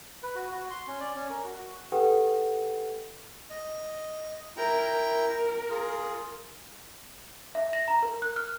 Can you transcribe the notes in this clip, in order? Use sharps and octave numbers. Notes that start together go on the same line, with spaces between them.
B4
F#4
F#4
C6
C#4
D5
C#4
A#4
F#4
F#4
G4 A4 B4 F#5 G5
D#5
E4 A#4 G5 A#5
A#4
F4 G#4
E5
A#6
A#5
A#4
F#6
F6